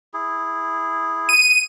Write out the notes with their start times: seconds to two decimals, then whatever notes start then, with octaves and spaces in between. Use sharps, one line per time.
0.14 E4 G#4
1.29 D#7